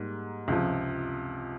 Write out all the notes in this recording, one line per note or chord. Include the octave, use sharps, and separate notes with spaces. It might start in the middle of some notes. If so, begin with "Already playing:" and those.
Already playing: G#2 G3 A#3
C#2 C3 F3